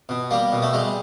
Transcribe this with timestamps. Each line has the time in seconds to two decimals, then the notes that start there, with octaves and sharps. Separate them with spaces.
0.09 B2
0.31 G3 A#3
0.52 B2
0.62 A3
0.73 G3 G#3